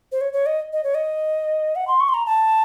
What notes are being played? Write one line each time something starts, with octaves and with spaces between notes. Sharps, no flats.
C5
C#5
C#5
D#5
D#5
C#5
D#5
F#5
C6
C#6
C6
A#5
A5